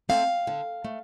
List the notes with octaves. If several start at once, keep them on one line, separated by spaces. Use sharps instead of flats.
A3 C4 F5
D3
A3